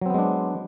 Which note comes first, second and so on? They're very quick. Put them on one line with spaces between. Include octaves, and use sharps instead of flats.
F#3 C4 B3 G#3 D4